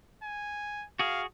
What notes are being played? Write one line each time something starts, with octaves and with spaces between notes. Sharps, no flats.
G#5
F#4 G#4 F5